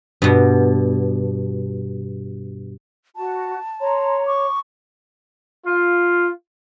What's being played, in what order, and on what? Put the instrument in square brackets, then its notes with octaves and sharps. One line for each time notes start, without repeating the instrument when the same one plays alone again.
[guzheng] G2 B2
[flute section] F#4 [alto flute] A5
[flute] C#5 [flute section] A#5 C6
[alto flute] C#6 [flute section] D6
[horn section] F4